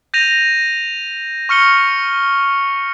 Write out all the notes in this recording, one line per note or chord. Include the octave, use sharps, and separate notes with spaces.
G6 A#6 D#7 F7
C#6 F6 C#7 G7